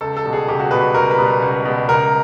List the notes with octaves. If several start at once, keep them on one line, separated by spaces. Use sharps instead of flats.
C#2 A4
A4
B2 G3
G#4
C#2 G4
F#4
B2 G3 B4
C#2 A#4
B4
B2 G3
C#2
B2 G3
C#2 A#4